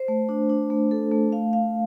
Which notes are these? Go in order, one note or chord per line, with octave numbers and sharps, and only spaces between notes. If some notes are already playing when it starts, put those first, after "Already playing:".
Already playing: C5
A3
D4
D4
A3
A4
A3
F5
F5